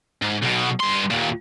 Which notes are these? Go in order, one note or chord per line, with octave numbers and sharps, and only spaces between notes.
G#2
B1 B2
G2 C6
D#2 A#2